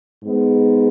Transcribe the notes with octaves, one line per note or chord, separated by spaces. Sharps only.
G#2 G#3 B3